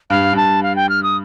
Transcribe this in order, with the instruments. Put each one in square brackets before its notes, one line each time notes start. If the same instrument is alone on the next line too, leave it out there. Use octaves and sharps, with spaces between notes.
[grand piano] G2 [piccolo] F5
[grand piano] G2 [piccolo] A5
[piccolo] F5
G5
F6
D#6